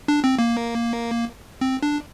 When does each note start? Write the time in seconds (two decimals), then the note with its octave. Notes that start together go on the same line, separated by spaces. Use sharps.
0.08 D4
0.24 C4
0.39 A#3
1.61 C4
1.83 D4